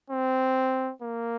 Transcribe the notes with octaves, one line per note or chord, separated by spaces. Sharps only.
C4
A#3